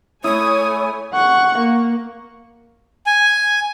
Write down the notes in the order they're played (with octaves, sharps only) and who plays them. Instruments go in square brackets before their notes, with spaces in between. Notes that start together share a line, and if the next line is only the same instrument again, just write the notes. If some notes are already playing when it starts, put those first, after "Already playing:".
[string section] A3 G#5 [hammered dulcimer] E4 [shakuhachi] C#5 [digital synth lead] D#6
[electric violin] F#5 C#6
A#3
[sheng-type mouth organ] G#5